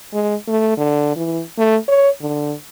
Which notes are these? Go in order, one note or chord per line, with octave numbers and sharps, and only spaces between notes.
G#3
A3
D3
E3
A3
C#5
D3